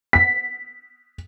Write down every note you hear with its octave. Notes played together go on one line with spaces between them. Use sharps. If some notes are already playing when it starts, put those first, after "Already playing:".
B6